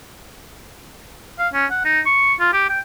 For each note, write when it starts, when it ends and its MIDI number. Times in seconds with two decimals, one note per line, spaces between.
1.39 1.48 77
1.53 1.66 61
1.71 1.82 78
1.85 2.00 63
2.06 2.34 85
2.40 2.50 65
2.53 2.68 67
2.69 2.80 79